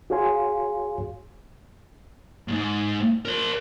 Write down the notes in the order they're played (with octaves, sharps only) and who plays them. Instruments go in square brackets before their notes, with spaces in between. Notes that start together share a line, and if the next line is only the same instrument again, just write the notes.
[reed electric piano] F#4 G#4 C#5 F5 G#5 C6
[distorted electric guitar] D#2 G#2
A#4 C5